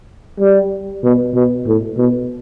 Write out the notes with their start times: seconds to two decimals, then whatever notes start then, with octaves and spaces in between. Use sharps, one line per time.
0.40 G3
1.04 B2
1.35 B2
1.66 A2
1.98 B2